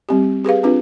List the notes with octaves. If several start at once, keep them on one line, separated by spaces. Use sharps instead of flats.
G3 C4 G4
G4 G#4 B4 F5
C4 D4 F4 B4